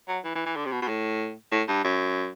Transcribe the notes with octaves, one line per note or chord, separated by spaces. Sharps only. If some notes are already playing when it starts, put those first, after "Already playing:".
F#3
E3
E3
E3
D3
C3
B2
B2
A2
A2
G2
F#2